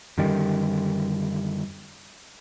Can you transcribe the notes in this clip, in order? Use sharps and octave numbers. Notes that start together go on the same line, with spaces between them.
F#2 D3 D#3 G3